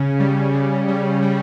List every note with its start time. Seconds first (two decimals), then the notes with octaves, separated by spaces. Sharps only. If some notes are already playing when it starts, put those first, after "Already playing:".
Already playing: C#3 C#4
0.20 G3
0.54 C#3
0.88 G3
1.22 G3